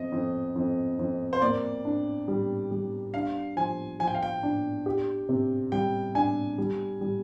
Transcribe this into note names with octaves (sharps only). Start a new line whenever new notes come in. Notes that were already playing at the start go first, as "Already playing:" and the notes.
Already playing: F2 D#5
F2
F2
F2
C5
A#3 D5
D4
G3
G3
D4 F5
F3 G#5
F3 G#5
G5
F5
G5
D4
G4
C3
G3 G5
D4 G#5
G3
G3